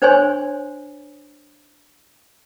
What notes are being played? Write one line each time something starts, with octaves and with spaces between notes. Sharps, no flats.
D4 C5 C#5 G#5 C6